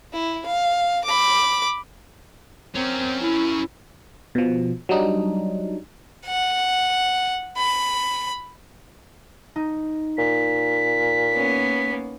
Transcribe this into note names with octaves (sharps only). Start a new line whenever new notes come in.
E4
F5
B5 D6
C4 C#4 A#4
E4
B2 F3
F#3 G3 D4 D#4
F#5
B5
D#4
A#2 B6
A#3 B3 C#4